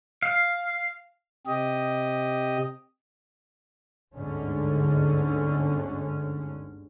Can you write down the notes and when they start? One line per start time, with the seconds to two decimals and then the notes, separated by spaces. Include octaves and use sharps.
0.23 F5
1.46 C3 G4 D#5
4.14 G1 D2 G#2 D3 C#4